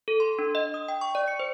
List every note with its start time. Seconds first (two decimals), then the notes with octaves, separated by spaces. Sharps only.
0.08 A4
0.20 C6
0.39 D4
0.55 D#5
0.74 D#6
0.88 G5
1.01 C#6
1.15 D5
1.28 C#7
1.40 C5